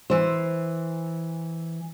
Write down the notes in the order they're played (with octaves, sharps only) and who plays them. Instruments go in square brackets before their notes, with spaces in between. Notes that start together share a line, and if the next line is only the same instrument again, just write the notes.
[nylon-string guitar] E3 C5